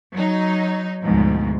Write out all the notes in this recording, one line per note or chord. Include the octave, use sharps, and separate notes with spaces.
F#3 D#4
D2 G#2 B2 F3